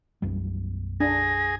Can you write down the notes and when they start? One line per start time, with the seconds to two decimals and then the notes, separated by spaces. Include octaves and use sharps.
0.22 B1 F#2 G3
1.00 D4 G#4 A#6